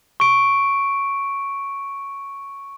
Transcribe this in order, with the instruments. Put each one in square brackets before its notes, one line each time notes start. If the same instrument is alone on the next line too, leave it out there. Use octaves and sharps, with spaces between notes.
[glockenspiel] C#6 D7